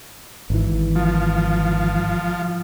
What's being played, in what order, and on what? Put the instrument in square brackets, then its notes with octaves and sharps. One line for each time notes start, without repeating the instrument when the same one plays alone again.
[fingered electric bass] G#1 E3
[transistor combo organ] F3